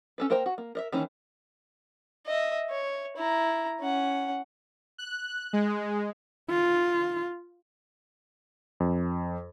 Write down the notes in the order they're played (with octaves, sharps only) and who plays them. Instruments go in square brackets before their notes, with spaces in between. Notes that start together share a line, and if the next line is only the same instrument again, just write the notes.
[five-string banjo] C#4 A4 B4
A#3 A#4 C5 G5 A#5
F#4
A#3
A#4 D#5 E5
D#3 E3 A#3 C#4
[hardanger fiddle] D#5 E5
C#5
E4 A#5
C#4 F#5
[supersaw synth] F#6
G#3
[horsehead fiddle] F4
[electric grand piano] F2